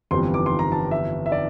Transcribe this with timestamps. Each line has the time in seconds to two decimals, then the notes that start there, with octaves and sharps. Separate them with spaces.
0.11 G1 F2 E3 G3 C4 C6
0.34 D6
0.46 C6
0.59 A#5
0.72 A5
0.91 E5
1.26 E5
1.32 D5